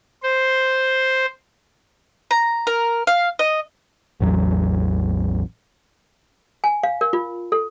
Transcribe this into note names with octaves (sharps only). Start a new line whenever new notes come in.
C5
A#5
A#4
F5
D#5
A1 E2 F#3
G#5
F5
A#4
F4
A4